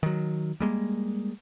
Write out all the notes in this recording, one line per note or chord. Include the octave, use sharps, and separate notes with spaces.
D#3 F#3
G3 G#3 A#3